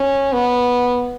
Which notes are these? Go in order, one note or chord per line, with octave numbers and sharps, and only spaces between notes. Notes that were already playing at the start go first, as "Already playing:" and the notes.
Already playing: C#4
B3